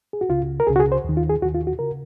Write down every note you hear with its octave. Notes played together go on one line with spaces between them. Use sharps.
G#4
F#4
C#2 C#3 F4
A#4
C#2 C#3 G#4
F#4
G#4
C5
D#2 D#3
F4
G#4
D#2 D#3 F#4
F4
F#4
C#3 A#4